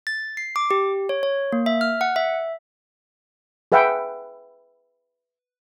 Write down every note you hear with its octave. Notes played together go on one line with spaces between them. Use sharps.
A6
C7
D6
G4
C#5
C#5
A#3
E5
F6
F#5
E5
G#4 B4 E5 F#5 G5